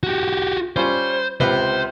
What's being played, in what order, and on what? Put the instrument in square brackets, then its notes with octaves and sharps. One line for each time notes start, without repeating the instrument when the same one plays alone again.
[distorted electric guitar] F#4 G4
[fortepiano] G3 C#4 F4 [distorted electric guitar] C5
[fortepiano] C#2 C3 B4 [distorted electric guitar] C5